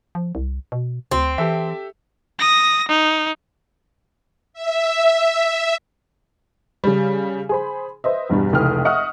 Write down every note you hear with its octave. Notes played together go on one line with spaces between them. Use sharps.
F3
C2
B2
D2 C4
E3 G4 A4 E5
D#6 A#6
D#4
E5
C#3 G3
G#4 C5 B5
B4 C5 D#5 E5
E2 G2 B2 G3
F1 C#2 E3 G5 D#6 F6
D#5 E5 F#5 C#6 D#6 F6